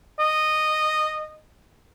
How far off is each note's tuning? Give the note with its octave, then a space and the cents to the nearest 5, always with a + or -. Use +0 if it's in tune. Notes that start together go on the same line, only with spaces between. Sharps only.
D#5 -10